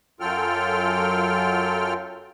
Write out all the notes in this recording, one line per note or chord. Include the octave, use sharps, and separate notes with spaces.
F#2 F#3 F4 A4 G5 F6